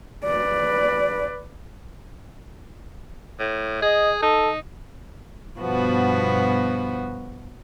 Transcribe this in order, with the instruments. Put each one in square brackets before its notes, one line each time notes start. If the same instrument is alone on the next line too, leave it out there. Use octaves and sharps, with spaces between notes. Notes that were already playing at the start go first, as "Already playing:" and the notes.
[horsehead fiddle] B4 D5
[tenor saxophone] A2
[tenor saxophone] G#4 [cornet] D#5
[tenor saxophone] D#4 [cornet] A4
[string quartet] G2 B2 F3 B3 F#4